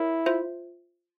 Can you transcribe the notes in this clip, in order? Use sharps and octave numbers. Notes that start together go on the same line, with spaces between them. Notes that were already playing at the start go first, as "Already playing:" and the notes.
Already playing: E4 A#4 C#5
F4 C5 E5